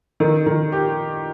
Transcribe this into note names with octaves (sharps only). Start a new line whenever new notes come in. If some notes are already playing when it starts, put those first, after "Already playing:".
D#3 A#4
D#3
G4